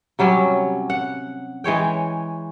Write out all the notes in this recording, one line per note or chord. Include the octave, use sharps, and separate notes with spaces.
C3 F#3 G3 C#4
F#5
E3 G#3 C#5 G5